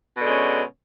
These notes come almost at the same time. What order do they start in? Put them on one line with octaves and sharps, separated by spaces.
B2 D3 G#3 C#4